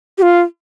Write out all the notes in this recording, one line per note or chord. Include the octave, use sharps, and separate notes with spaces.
G4
F4